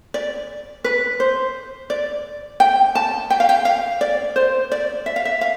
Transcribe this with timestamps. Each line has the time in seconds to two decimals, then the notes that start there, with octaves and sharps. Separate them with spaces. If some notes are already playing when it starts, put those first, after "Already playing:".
0.14 D5
0.84 B4
1.20 C5
1.90 D5
2.60 G5
2.95 A5
3.30 G5
3.40 F5
3.49 G5
3.65 F5
4.01 D5
4.36 C5
4.72 D5
5.06 E5
5.16 F5
5.25 E5
5.41 F5